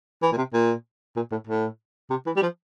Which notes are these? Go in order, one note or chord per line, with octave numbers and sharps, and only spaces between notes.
E3
A#2
C3
A#2
A#2
A2
A2
C3
E3
G3
F3